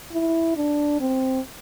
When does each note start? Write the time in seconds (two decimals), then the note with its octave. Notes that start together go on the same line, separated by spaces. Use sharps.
0.12 E4
0.56 D4
1.00 C4